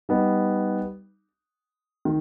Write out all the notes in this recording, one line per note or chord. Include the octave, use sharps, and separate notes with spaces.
G3 B3 D#4
D#3